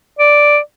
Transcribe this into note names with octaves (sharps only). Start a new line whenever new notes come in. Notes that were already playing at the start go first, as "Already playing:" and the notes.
D5